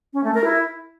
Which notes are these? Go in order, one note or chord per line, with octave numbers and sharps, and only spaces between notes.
C#4
A3
A#4
E4